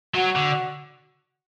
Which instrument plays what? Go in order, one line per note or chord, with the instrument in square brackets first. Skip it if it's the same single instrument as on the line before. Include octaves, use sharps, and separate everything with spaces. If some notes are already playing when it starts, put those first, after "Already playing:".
[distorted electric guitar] F#3 [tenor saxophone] F#4
[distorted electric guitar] D3